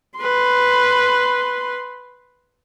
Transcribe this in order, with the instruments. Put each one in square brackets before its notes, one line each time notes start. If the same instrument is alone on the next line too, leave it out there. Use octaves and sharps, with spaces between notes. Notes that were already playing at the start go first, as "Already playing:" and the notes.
[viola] B4 C6